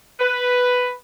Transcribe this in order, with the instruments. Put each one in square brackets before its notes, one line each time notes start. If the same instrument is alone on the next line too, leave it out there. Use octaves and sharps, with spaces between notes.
[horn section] B4